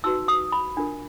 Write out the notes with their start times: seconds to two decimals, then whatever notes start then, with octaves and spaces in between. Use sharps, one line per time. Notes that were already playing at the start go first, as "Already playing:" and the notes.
0.04 D#4 F#4 B4 E6
0.28 D#6
0.52 B5
0.77 D4 F4 A#4